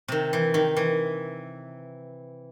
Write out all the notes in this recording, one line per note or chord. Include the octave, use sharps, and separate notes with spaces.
C3 D#3
E3
D#3
E3